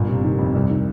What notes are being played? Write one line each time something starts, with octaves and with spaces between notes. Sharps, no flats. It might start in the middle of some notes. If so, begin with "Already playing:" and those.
Already playing: G1 A#2
C3
D#3
F2
C2
D#3